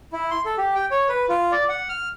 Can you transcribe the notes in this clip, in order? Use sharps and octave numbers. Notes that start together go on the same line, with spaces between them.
E4
C6
A4
G4
G5
C#5
B4
F4
D5
F#5
F6